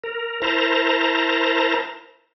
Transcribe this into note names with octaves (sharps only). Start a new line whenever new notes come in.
A#4
E4 A#4 C5 A5 A#5